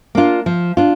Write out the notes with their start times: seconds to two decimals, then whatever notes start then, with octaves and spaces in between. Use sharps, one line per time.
0.15 A#3 D4 F4
0.46 F3
0.77 D4 F4